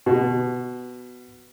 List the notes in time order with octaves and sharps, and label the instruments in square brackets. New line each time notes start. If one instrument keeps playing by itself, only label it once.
[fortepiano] B2